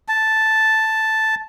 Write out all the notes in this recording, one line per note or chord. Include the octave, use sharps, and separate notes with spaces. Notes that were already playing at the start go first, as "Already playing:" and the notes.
A5